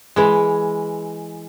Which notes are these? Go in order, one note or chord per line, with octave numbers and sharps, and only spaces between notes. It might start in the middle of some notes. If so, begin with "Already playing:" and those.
E3 G#3